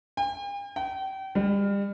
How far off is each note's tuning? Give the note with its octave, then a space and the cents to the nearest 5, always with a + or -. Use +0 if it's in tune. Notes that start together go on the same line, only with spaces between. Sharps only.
G5 +45
G5 -35
G3 +35